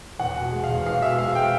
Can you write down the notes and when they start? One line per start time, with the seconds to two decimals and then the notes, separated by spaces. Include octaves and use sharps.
0.19 E2 F#5
0.36 B2
0.52 G#3
0.64 F5
0.69 E2
0.86 E2 F5
1.02 B2 E5
1.18 G#3 F5
1.35 G5